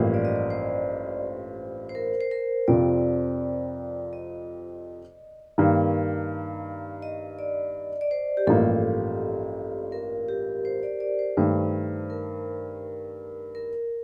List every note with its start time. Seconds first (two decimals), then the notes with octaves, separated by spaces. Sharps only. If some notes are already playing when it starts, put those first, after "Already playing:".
Already playing: A1 G2 F3 A#3 C5
0.14 D5
0.25 D#5
0.36 D5
0.50 C5
1.89 C5
1.95 A#4
2.21 C5
2.31 A#4
2.68 F2 C3 F3 C4 D5
4.13 D#5
5.58 G2 D#3 A#3
7.02 D#5
7.39 D5
8.01 D5
8.11 C5
8.37 G4
8.47 A1 G2 F3 A#3 A4
9.92 A#4
10.28 G4
10.65 C5
10.83 D5
11.00 D5
11.19 C5
11.37 G2 D#3 A3 C5
12.10 A#4
13.55 A#4